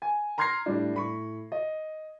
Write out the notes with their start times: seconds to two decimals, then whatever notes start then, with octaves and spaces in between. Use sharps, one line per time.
0.02 G#5
0.38 A#5 C6 F6 G#6 A#6 C7
0.66 A2 G3 D4
0.94 A2 B5 C#6
1.52 D#5